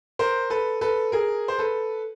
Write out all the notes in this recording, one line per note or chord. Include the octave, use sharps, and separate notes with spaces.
A#4 C5
A4 B4
A4 B4
G#4 A#4
C5
A4 B4